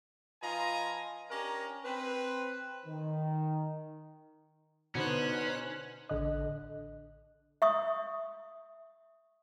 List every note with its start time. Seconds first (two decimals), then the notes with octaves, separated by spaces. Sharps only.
0.42 F3 F4 B4 D#5 G#5 A#5
1.30 C#4 D4 G4 A#4 A#5
1.84 C4 B4
2.86 D#3
4.95 B2 D3 C#4 D#4 B4 C5 F#6
6.09 A1 D3 D#5 F#6
7.62 E5 C#6 D#6